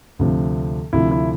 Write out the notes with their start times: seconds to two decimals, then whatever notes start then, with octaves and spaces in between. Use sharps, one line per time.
0.19 D2 C3 F3
0.93 D2 C3 F3 E4
1.11 E4